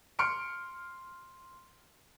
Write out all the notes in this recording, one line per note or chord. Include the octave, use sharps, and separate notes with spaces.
C6 F6 C#7 D7